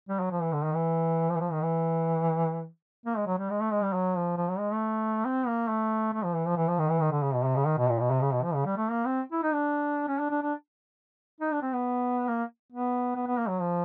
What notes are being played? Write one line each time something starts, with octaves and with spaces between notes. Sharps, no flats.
G3
F#3
F3
E3
D3
D#3
E3
F3
E3
F3
D#3
E3
A#3
G#3
F#3
G3
G#3
A3
G#3
G3
F#3
F3
F3
F#3
G#3
A3
C4
A#3
A3
A3
F3
E3
F3
E3
F3
D#3
E3
D#3
D3
C#3
B2
C3
C#3
D#3
B2
A#2
B2
C3
C#3
B2
F3
C#3
G3
A3
A#3
C4
E4
D#4
D4
C#4
D4
D4
D4
D#4
D4
C4
B3
A#3
B3
B3
B3
A#3
F#3
F3